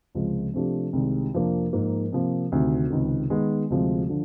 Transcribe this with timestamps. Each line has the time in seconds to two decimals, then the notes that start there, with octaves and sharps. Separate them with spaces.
0.15 C#2 C3 F3 G#3
0.54 C3 F3 A3 D4 G4
0.93 C2 C3 D#3 G#3
1.33 F2 C3 F3 A#3 D4
1.73 G#2 F3 A#3
2.12 C3 F3 A#3
2.52 D2 C3 D#3
2.90 C#2 C3 D#3
3.30 D#3 G#3 B3
3.70 D2 C3 F3 G#3
4.09 D3 F3